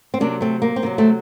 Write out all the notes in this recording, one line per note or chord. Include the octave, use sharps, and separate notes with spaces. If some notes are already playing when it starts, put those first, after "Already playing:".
C4
C3 F#3 A#3 D4
A3 C4
A#3
C4
C3 D#3 F#3 A#3
A3 C4